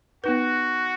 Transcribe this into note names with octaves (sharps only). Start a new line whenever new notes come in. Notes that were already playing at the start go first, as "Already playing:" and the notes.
B3 D#4 F#4 B4